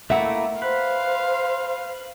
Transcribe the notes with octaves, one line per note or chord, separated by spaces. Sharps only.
A3 A#3 E4 E5 F#5
B4 C5 F5